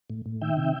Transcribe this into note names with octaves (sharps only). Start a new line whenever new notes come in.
A2
A2
D#3 E5 G5
C3